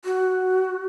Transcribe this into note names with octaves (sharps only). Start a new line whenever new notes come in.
F#4